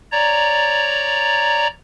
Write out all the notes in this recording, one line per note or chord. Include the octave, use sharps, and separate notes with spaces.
C#5 D5 A#5